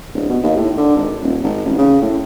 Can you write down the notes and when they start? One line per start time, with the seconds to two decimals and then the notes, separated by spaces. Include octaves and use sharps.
0.14 D1
0.30 B2
0.43 D#2
0.57 A2
0.78 D3
0.97 G#1
1.23 D#1
1.43 G#1
1.66 A1
1.78 C#3
2.02 A2